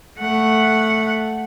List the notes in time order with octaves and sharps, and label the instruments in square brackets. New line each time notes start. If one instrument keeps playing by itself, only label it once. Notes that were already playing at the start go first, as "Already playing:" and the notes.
[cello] A3 F#5